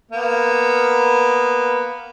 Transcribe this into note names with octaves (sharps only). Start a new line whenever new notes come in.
A#3 B3